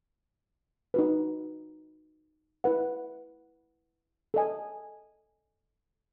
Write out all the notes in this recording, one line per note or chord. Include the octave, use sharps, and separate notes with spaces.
D#4 F#4 B4
E4 B4 F#5
A4 D#5 G#5